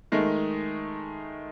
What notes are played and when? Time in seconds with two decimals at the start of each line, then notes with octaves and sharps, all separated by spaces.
0.12 D#3 G#3 A3 D#4